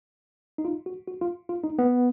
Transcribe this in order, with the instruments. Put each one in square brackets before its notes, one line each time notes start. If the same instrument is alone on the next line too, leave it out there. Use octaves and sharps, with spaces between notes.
[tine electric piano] D#4
F4
F#4
F#4
F4
F4
D#4
B3